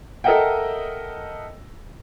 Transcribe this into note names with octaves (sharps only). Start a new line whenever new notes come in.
A4 A#4 D#5 E5 F#5 G5